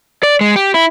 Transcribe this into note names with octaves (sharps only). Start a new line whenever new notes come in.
D5
G#3
G4
E4